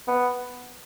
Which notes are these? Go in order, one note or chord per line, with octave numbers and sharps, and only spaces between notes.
B3